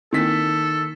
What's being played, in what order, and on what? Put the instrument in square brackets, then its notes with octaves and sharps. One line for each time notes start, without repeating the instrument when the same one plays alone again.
[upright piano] D#3 B6 [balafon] A#3 C4 E4 [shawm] A4